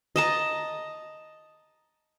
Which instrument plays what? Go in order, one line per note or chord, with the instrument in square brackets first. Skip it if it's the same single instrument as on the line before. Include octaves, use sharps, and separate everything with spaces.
[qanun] D#5 A5 A#5